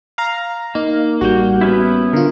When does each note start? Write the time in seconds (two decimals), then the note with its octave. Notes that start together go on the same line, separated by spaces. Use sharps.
0.18 F5 A#5
0.75 A#3 D#4
1.21 A1 G3 F#4 G6
1.61 B3 C#4 E4
2.13 D3 F4 A#4